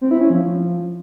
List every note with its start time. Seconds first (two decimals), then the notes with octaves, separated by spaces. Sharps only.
0.01 C4
0.11 E4
0.21 C#4
0.30 F3